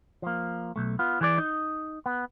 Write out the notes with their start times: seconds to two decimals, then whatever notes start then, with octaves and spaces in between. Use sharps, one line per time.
0.22 F3 A#3
0.76 B1 A3
0.99 B3 F4
1.21 E3 G#4 C#5 D5
1.38 D#4
2.06 B3